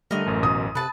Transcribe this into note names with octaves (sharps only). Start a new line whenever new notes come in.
D3 G3 A3 A#4 D#5
A1 F#2
B2 D#6
C3 B4 A5